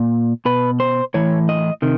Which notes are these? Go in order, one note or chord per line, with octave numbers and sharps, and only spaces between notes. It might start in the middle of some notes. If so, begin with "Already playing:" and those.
Already playing: A#2
B2 B4
C5
A2 E3 C#5
D#5
C3 D#3